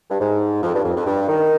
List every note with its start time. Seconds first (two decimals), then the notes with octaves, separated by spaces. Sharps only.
0.10 G2
0.20 G#2
0.63 F2
0.75 G2
0.84 F2
0.96 F2
1.06 G2
1.28 D#3